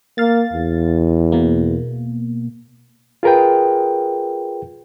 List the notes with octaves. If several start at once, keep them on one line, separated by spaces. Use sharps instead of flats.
A#3 F5 A6
E2
B2 A#3
F4 G#4 A#4 B4 G5